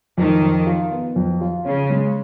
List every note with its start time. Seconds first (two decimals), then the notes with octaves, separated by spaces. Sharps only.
0.18 F2 D#3
0.42 F2
0.66 F4
0.91 B3
1.16 F2
1.41 F4
1.65 C#3 C#4
1.90 G#3